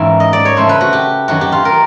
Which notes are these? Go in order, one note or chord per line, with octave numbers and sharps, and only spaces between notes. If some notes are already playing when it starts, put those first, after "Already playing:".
Already playing: G#2 E3 G3 A#3 C#4 E5
D#5
D5
C#5
F2 C#3 F3 A3 C5
B4
F#4
G4
F#2 D#3 F#3 F#4
G4
F4
A#4